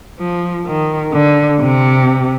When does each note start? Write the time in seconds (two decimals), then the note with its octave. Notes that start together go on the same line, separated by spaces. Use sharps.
0.19 F3
0.66 D#3
1.13 D3
1.61 C3